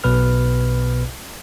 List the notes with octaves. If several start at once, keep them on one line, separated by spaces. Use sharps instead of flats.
B1 B2 B4 F6